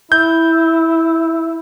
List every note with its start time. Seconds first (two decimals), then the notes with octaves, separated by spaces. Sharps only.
0.12 E4 G6